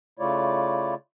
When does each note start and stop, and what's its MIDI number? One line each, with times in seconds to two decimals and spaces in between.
0.19 0.94 49
0.19 0.94 57
0.19 0.94 64
0.19 0.94 65
0.19 0.94 73
0.19 0.94 74